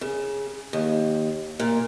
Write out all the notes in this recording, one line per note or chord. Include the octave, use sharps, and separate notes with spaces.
C#3
D#2
A#2